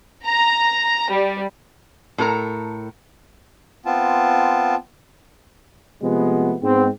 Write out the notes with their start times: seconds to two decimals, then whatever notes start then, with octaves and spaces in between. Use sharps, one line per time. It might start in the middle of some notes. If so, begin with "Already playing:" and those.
0.24 A#5
1.10 G3
2.18 A2 A4 A#4 A#5
3.86 B3 C4 F4 A5
6.02 C3 F3 G#3 A3 B3
6.63 G#2 B3 C4